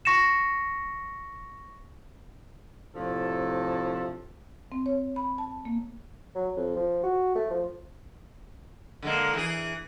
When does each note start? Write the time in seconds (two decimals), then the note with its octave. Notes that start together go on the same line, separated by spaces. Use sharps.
0.05 C#6 A#6 C#7 E7
2.95 A2 C3 F3 D4 A4
4.72 C4
4.86 C#5
5.16 B5
5.38 A5
5.65 A#3
6.35 F#3
6.57 F2
6.76 F3
7.03 F#4
7.35 A3
7.50 F3
9.02 D3 G#3 A#3
9.34 E3 G#4